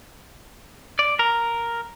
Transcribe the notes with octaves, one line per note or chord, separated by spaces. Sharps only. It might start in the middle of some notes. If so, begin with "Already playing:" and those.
D5
A#4